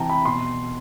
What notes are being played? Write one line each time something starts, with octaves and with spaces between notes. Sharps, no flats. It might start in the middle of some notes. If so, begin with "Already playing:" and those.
Already playing: C3 E3 G5 A5 A#5
B5
B2 C6